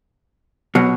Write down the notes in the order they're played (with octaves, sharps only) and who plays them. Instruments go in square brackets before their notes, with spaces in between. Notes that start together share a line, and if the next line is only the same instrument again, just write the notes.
[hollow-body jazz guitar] B2 F#3